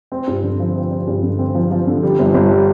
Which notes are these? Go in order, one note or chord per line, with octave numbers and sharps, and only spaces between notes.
C4
G2
D3
F3
C4
C4
G2
D3
C4
F3
F3
D3
G3
G1
G1
G3